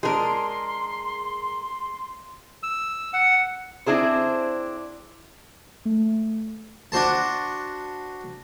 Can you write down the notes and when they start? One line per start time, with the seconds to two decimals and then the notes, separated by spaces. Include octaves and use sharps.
0.03 G#3 D4 G#4 A#4 C6
2.63 E6
3.13 F#5
3.86 C4 D4 E4 G#4 C5
5.85 A3
6.92 D4 F#4 C5 A5